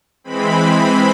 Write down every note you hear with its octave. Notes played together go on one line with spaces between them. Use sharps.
E3 G#3 C4 B5
B5